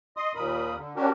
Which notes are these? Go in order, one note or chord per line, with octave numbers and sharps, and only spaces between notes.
D#5 C6 D#6
D#2 A#2 A#4 B5 D#6
D3
C#4 D4 F#4 G4 A#4